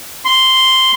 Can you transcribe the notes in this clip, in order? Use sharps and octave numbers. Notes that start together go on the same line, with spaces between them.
C6